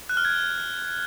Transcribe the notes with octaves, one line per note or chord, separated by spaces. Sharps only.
F#6
F6
G#6